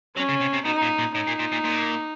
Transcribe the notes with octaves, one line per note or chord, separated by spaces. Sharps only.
F#3 C#4
C#3
C3
C3
B2 D#4
A#2
A#2
A2 D#4
A#2
A#2
A#2
A#2